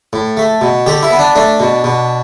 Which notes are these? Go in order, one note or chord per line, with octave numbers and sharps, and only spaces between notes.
A2
A3
B2
D3 G4
E4
B3
D4
A3 D4
B2
B2